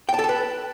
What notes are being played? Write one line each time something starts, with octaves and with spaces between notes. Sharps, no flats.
G5
A5
A4
A5
B4